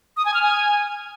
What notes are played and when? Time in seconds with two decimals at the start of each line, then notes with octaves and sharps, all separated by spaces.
0.17 D#6
0.25 G#5
0.34 F6
0.43 G#5